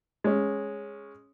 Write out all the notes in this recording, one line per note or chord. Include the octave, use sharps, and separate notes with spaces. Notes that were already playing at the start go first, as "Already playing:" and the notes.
G#3 C#4